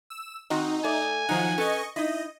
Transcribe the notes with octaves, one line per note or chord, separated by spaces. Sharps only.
E6
D#3 C4 D#4 F#4
A3 D5 G#5
D#3 F3 F#3 D#4 F#5
C#4 A4 B4 D#5 C#6
D#4 E4 D#5